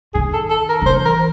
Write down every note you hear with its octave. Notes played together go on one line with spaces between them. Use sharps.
D#3 G#4
A4
A4
A#4
D#3
E3 C5
A#4